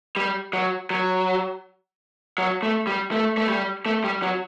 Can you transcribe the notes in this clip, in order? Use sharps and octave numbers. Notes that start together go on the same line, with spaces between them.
G3
F#3
F#3
F#3
A3
G3
A3
A3
G3
A3
G3
F#3